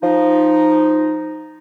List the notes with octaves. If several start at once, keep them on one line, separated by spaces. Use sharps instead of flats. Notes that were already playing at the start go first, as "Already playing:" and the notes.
F3 D#4